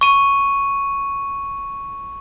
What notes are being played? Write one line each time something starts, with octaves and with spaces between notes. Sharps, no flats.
C#6 D#7